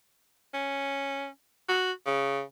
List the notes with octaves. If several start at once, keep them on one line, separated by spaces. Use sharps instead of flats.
C#4
F#4
C#3